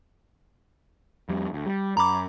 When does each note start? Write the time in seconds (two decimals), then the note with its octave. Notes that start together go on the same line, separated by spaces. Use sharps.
1.29 F2 G3
1.53 D2
1.66 G3
1.97 F#2 A#5 B5 D6